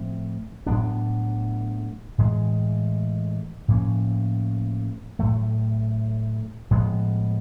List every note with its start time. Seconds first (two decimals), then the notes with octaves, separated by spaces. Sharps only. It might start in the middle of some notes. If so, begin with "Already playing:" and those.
Already playing: A2 F3 A3 C4
0.67 A2 F#3 B3 D4
2.18 A2 E3 G#3
3.68 A2 F3 A#3 C#4
5.19 A2 F#3 A3
6.71 A2 F3 G#3 B3